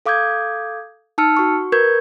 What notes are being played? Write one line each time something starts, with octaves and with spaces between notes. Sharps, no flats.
A4 F5 D6 D#6 G6 G#6
D#4 A5 E6 F6 C#7
F#4 C#6
A#4 B4 C#6 G6 G#6